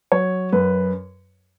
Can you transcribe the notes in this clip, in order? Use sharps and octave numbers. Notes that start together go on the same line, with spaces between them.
F#3 C#5
F#2 B4